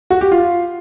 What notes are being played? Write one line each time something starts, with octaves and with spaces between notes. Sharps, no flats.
F#4
G4
F4